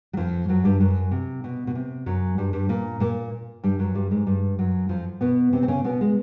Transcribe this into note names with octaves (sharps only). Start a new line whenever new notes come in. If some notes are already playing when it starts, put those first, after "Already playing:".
F#3
F2 F3
F#2 F#3
G2 G3
F#2 F#3
C3
B2
B2
C3
F#2 F#3
G2 G3
G2 G3
A#2 A#3
A#2 A#3
G2 G3
F#2 F#3
G2 G3
G#2 G#3
G2 G3
F#2 F#3
F2 F3
B2 B3
C3 C4
C4
C#3 C#4
B2 B3
G#3